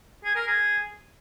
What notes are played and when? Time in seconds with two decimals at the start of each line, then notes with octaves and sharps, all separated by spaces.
0.24 G#4
0.36 A#4
0.47 G#4